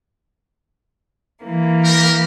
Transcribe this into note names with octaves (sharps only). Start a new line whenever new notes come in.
E3 A#3
G4 A#4